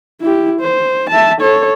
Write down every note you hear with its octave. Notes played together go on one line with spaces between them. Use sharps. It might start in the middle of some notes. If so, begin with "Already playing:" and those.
E4 G4
C5
E5 A5
A4 C#5